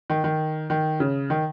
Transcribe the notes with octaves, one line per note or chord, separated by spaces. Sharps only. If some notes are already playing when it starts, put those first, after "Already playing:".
D#3
D#3
D#3
C#3
D#3